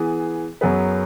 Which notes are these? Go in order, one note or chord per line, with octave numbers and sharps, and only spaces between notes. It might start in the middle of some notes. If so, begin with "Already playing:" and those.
Already playing: E3 B3 G#4 B4
F#2 F#3 B3 G#4 B4